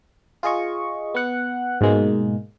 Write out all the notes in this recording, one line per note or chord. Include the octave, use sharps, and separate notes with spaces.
F4 G#4 D#5 C#6
B3 F#5 F#6
G#2 B2 G#3 A#3